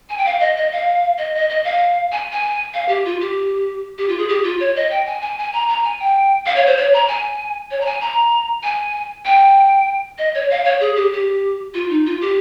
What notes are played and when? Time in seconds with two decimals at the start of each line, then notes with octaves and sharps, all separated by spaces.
0.10 G#5
0.18 G5
0.26 F5
0.41 D#5
0.56 D#5
0.72 F5
1.18 D#5
1.35 D#5
1.50 D#5
1.65 F5
2.12 G#5
2.32 G#5
2.74 F5
2.89 G4
3.05 F4
3.20 G4
3.98 G4
4.09 F4
4.18 G#4
4.29 G4
4.44 F4
4.60 C#5
4.76 D#5
4.91 G5
5.06 G#5
5.22 G#5
5.38 G#5
5.53 A#5
5.69 A#5
5.84 G#5
6.00 G5
6.46 F5
6.56 C#5
6.67 C5
6.77 C#5
6.94 A#5
7.08 G#5
7.71 C#5
7.81 A#5
7.86 G#5
8.01 A#5
8.63 G#5
9.25 G5
10.18 D#5
10.35 C#5
10.51 F5
10.65 C#5
10.81 G#4
10.96 G4
11.12 G4
11.74 F4
11.90 D#4
12.06 F4
12.21 G4